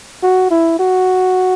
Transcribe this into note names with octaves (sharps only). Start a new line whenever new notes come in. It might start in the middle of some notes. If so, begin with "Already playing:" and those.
F#4
E4
F#4